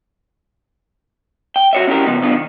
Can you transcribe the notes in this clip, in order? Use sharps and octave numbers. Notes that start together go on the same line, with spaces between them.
G5
F#4 C#5 E5
C#4 E4 G4 A#4
C#3 F3 B3 D#4
B2 D3 B3 D4 F4
D#3